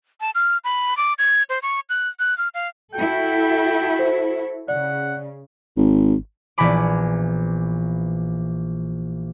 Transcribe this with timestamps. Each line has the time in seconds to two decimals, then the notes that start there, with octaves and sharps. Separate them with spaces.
0.21 A5
0.35 F6
0.64 B5
0.97 D6
1.19 G#6
1.50 C5
1.62 C#6
1.90 F#6
2.19 F#6
2.38 F6
2.54 F5
2.94 E4 F#4 A4 G5
3.99 C5
4.68 C#3 D5 F#5
5.77 G#1
6.58 A#1 E3 B3 G#5 B5 D6